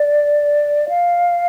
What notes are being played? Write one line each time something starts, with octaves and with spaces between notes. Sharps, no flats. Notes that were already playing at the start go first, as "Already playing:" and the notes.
Already playing: D5
F5